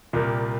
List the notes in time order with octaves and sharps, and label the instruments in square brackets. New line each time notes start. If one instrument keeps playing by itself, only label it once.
[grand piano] C2 A#2 G3 A#3